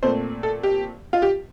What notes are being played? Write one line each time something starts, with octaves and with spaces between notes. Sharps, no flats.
A#2 A3 C4 C5
A4
G4
F4
G4